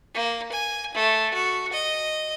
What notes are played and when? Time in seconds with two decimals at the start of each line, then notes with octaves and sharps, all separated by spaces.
0.14 A#3
0.52 G#5
0.94 A3
1.34 F#4
1.73 D#5